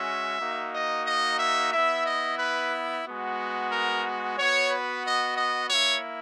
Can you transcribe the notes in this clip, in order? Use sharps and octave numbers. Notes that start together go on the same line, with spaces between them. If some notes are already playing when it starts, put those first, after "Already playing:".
Already playing: G#3 C#4 F#4 E5
A#3 D#4 F#4
D#5
D#5
E5
B3 E4 E5
D#5
B4
G#3 B3 F#4
A#4
B3 F#4 C#5
B4
D#5
D#5
A#3 E4 C#5